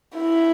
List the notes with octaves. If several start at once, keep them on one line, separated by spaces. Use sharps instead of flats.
E4